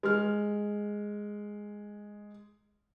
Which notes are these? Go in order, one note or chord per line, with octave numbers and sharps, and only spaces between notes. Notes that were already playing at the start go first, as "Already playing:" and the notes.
G#3 F6